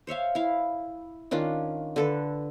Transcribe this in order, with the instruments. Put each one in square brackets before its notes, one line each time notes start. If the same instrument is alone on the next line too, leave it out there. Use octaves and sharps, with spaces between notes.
[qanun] C5 C#5 E5 F5
E4 F5
D#3 C#4 D4 F4
D3 A4 B4